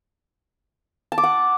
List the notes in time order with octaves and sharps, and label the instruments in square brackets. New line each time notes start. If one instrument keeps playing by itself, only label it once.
[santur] A5
D6
F#5